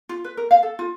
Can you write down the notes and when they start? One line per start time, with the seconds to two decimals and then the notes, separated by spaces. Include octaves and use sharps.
0.09 F4
0.24 B4
0.37 A#4
0.51 F5
0.63 A4
0.79 F4